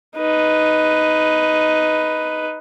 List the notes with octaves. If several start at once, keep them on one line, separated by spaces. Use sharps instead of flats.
D#4 B4